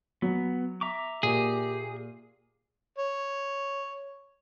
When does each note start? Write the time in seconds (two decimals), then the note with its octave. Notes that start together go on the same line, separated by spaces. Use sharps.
0.22 F#3 B3
0.81 E5 A#5 D6
1.23 A#2 G4 G#4
2.99 C#5